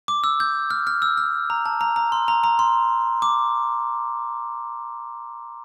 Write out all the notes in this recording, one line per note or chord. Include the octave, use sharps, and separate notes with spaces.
D6
E6
G6
F6
F6
E6
F6
A#5
A5
A#5
A#5
C6
A#5
A#5
C6
D6